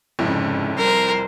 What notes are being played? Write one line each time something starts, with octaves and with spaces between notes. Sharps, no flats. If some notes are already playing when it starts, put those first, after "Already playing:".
F1 F2 G#2 C#3 E4
G3 A#4 C5